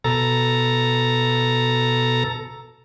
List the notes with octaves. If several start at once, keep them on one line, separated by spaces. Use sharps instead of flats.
B2 A4 A#5